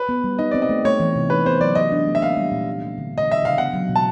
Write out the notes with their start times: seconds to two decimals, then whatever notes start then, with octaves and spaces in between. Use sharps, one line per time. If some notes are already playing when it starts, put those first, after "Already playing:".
Already playing: B4
0.09 B3
0.24 G3
0.39 D#4 D#5
0.51 C4 D5
0.62 D#5
0.69 A3
0.85 A3 C#5
1.00 E3
1.16 C3
1.30 D#4 B4
1.46 B3 C5
1.61 F#3 D5
1.75 G4 D#5
1.92 D4
2.07 A3
2.15 E5
2.21 A#3 F5
2.37 G3
2.51 A#2
2.68 C4
2.83 G3
2.98 D3
3.13 G#3 D#5
3.28 E3 E5
3.43 C#3 F5
3.58 B3 F#5
3.73 F#3
3.89 B2
3.96 A5